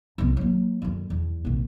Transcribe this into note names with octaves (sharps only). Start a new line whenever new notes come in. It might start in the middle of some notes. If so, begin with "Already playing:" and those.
C2 B3
F#3 A#3
F#2 D3
E2
A#1 C3